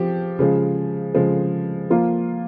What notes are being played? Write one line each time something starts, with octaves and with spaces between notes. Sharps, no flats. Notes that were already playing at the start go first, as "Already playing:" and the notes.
Already playing: F3 C4 G4
C#3 F3 G#3
C#3 F3 G#3
F3 A#3 F4